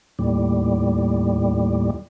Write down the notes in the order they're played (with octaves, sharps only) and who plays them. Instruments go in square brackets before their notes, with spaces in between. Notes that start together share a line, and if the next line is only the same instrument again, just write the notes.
[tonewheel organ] D#2 A2 G3